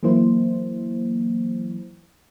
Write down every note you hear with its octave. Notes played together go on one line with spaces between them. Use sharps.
E3 F#3 A#3 E4 C5